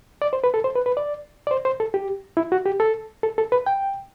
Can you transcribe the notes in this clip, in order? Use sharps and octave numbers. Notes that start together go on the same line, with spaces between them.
D5
C5
B4
A4
C5
B4
B4
D5
D5
C5
C5
A4
G4
E4
F#4
G4
A4
A4
A4
B4
G5